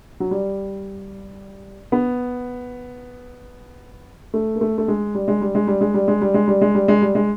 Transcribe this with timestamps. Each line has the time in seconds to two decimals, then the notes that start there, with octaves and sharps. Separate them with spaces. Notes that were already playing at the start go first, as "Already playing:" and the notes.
0.20 F#3
0.31 G3
1.92 B3
4.34 A3
4.55 A#3
4.61 A3
4.78 A3
4.88 G#3
5.15 G3
5.28 G#3
5.41 G3
5.55 G#3
5.68 G3
5.81 G#3
5.94 G3
6.08 G#3
6.22 G3
6.34 G#3
6.48 G3
6.61 G#3
6.75 G3
6.88 G#3
7.02 G3
7.15 G#3